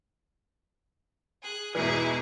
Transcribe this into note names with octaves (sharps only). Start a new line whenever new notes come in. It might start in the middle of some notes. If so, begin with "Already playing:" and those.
G#4 F#6
E2 G#2 B2 E3 E4 G#4